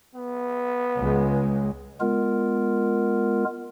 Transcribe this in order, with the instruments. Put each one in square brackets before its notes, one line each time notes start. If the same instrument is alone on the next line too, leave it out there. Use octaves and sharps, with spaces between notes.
[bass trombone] B3
[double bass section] C#2 G#3
[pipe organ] G#3 B3 F4 A#4